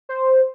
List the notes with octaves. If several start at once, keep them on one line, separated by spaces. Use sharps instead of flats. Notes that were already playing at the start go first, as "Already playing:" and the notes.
C5